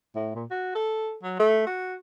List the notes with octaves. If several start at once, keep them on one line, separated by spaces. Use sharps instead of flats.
A2
A#2
F#4
A4
F#3
A3
F#4